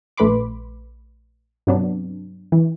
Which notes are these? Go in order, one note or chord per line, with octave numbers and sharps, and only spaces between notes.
A#1 A3 B4 B5 C6 D6
G2 C3 F#3 B3 D4
E3